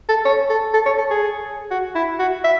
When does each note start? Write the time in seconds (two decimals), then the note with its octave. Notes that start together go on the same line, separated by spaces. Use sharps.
0.09 A4
0.25 C#5
0.50 A4
0.74 A4
0.86 C#5
0.98 A4
1.11 G#4
1.71 F#4
1.95 E4
2.19 F#4
2.44 E5